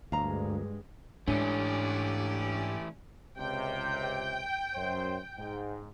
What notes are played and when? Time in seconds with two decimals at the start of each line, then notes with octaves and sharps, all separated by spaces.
0.12 D2 G2 G#3 F5 A#5
1.28 G#2 E3 A3 C#4 D4 G4 C#5 D5
3.38 C#2 C3 G5
4.75 F#2 C5
5.38 G#2